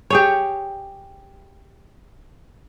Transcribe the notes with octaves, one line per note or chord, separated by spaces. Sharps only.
G4 G#4 C#5